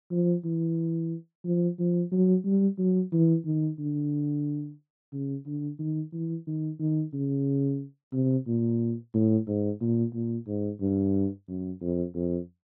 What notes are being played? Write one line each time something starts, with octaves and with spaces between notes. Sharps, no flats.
F3
E3
F3
F3
F#3
G3
F#3
E3
D#3
D3
C#3
D3
D#3
E3
D#3
D#3
C#3
C3
A#2
A2
G#2
A#2
A#2
G#2
G2
F#2
F2
F2